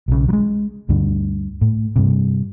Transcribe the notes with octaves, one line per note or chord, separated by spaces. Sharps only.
B1 C#3
F#3 G#3
D2 G2 D3
A2
G2 C3